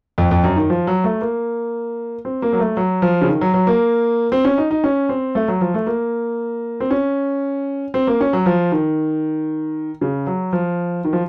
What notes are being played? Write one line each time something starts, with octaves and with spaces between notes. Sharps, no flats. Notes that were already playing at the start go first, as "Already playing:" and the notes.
F2
F2
F#2
D#3
F3
F#3
A3
A#3
C4
A#3
F#3
A3
F#3
F3
C#3
D#3
F#3
F#3
A#3
C4
C#4
D#4
D#4
C#4
C4
A3
F#3
F3
A3
A#3
C4
C#4
C4
A#3
C#4
F#3
F3
D#3
C#3
F#3
F3
D#3
F3